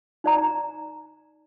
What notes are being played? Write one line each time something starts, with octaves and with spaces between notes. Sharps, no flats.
D#4 D5 A#5